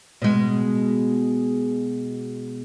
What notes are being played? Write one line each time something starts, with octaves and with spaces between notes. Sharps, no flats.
B2 G#3